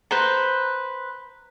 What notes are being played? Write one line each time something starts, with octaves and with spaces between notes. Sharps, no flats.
B4 C5 A#5